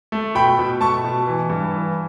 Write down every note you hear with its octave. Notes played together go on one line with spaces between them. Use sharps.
A3
B2 G5 B5
B2
A3 A5 C#6
B2
E3
G2
E3